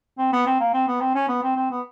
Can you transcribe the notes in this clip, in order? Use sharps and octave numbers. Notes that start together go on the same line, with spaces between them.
C4
B3
C4
A#3
C4
B3
C4
C#4
B3
C4
C4
B3